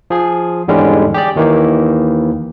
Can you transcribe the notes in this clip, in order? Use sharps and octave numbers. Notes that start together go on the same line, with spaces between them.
F3 G#4
E2 G#2 D3 G3 G#3 C#4
G4 G#4 D5
D#2 D#3 E3 A#3